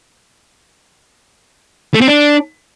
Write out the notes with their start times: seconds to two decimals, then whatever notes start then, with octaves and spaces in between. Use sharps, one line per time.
1.94 A3
2.01 C4
2.08 D4